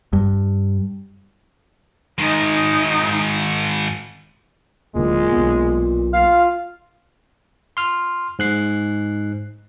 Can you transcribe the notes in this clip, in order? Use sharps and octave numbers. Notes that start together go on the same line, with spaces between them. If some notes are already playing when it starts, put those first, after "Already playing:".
G2
G#2 D#3 D#4
D1 A#2 D3 G#3
B1 B3
F4 F5
C6 F6
G#2 F#6 C7